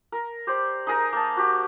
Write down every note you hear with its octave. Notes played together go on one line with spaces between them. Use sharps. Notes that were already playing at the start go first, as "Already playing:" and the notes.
A#4
G4 C5 D5
D#4 G#4 A#4
A#3 A5
F#4 G4